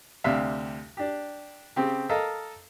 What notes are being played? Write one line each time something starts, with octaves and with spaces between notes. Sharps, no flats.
D2 C3 G3 E5 F5
D4 G4
C#3 C4 G4
A4 A#4 D#5 F5